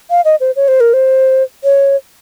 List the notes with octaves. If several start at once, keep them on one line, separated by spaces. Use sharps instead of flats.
F5
D#5
C5
C#5
C5
A#4
C5
C#5